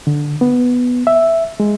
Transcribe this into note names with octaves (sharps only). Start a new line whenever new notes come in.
D3
B3
E5
G#3